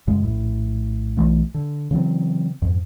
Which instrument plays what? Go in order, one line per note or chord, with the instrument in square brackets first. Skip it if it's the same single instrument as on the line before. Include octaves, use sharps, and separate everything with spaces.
[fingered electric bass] F#2 C#3 G#3
A#1 A2
B1 E3 A3
D3
C#3 E3 F#3 C4
F2 G#2